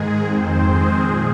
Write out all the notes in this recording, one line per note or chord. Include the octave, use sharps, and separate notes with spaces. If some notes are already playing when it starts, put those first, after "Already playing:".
Already playing: G#2 D#3 G#3 G#4
F2 D#3 C4 C5
G#3 G#4
A#2 F3